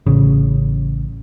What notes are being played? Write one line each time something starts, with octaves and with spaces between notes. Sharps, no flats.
A1 C#3